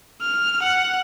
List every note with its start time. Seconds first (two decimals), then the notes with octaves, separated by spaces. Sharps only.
0.21 F6
0.63 F#5